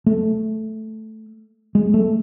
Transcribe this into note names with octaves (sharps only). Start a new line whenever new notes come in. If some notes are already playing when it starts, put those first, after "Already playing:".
A3
G#3
A3